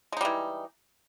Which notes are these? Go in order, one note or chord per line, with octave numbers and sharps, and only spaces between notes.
E3 G3 G#3 D#4